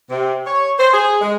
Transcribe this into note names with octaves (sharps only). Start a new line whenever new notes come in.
C3
C#5
C5
G#4
G#3